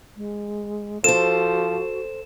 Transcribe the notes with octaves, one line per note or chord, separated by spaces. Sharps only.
G#3
F3 F#4 A4 C5 E7